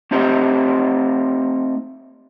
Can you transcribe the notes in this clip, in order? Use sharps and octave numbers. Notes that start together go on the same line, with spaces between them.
A3 C4 D#4 G4 C5